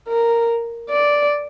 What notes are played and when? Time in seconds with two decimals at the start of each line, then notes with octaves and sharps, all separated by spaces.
0.09 A#4
0.90 D5